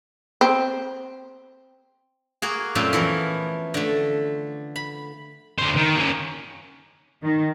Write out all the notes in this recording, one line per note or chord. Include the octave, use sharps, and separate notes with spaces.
C4
A#3 F#4 G#4
F#2 A#2 A3 C4 C#4 F4
E3 F3 B3 A#4
D3 A3
B5
D3 C5
D#3
A#3 C#4
D#3